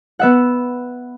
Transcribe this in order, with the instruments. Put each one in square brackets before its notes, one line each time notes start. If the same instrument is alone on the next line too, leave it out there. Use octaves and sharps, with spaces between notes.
[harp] B3 E5 F#5